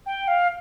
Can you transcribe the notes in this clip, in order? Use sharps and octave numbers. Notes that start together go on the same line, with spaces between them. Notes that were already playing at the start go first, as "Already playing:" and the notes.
G5
F5